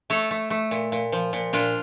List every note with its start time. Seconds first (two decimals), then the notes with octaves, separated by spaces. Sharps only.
0.10 A3 A4 C#5
0.31 A3
0.50 A3
0.71 A#2
0.92 A#2
1.12 F3
1.33 A#2
1.53 A#2 D4 F4